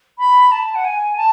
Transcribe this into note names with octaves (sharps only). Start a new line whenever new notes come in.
B5
A5
F#5
G#5
A5